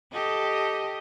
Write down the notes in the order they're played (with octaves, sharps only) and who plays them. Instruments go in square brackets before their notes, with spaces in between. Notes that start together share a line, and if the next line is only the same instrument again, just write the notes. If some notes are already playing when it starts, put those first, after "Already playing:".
[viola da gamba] G4 A4 D#5